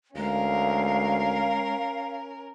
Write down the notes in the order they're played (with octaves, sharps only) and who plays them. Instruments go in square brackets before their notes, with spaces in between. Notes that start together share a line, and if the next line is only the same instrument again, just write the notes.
[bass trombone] D2 [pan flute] G#3 [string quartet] C#4 A#4 [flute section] F5